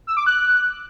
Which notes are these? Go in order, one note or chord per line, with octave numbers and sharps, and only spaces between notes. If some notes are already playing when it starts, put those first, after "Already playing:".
E6
D6
F#6